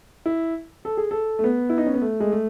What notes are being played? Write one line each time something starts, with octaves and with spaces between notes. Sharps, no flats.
E4
A4
G#4
A4
A3
B3
E4
D#4
C#4
B3
A3
G#3
A3